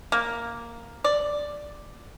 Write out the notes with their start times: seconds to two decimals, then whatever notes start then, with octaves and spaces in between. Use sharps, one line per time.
0.12 A#3
1.04 D5